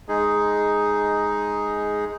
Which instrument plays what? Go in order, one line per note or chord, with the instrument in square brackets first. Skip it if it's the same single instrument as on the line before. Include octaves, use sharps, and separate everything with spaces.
[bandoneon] G#3 D#4 G#4